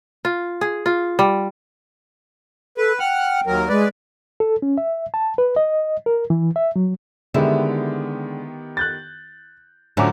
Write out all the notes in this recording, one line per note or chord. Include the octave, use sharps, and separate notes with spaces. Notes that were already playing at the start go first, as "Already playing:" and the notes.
F4
G#4
F4
G3
A4 B4
F#5 G5 F6 F#6
D#2 F#3 A#4
G#3 B4 D5
A4
C#4
E5
A5
B4
D#5
A#4
E3
E5
F#3
D3 D#3 G#3 B3 E4 G4
F#6 G6 A6
A2 D3 F3 F#3 C#4 F#5 A#5 D6